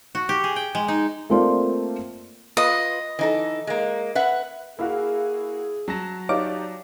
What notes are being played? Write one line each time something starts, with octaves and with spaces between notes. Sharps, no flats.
F#4
G4
G#4
G5
G#3
D#4
A3 A#3 C4 F4 C5 D5
F4 B4 D#5
E3 D#4 A4
G#3 A#3
B4 E5 F#5
A#3 E4 F#4 G#4 F5
F#3 A5 A#6
D#4 G4 C#5 D5 F5 D6